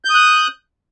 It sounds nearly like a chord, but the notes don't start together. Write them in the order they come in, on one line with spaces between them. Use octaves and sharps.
G6 D#6 F#6